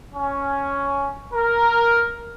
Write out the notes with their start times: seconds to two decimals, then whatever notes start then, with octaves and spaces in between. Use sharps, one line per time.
0.14 C#4
1.33 A#4